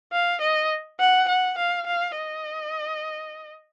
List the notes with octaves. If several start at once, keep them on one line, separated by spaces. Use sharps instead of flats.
F5
D#5
F#5
F#5
F5
F5
D#5